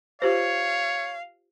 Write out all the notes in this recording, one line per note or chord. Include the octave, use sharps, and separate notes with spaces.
F4 G4 C5 C#5 F5